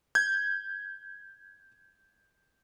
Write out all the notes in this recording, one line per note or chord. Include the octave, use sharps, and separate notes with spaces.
G6 G#6